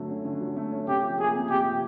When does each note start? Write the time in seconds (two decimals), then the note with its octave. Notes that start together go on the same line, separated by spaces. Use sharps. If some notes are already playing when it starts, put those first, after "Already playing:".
Already playing: D3 F#3 A3
0.09 C#4
0.25 D3
0.41 F#3
0.57 A3
0.72 C#4
0.88 C3 G4
1.03 F3
1.19 A#3 G#4
1.35 C3
1.49 C3 G4
1.65 F3